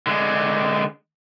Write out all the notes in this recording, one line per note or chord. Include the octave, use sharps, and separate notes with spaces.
D3 G#3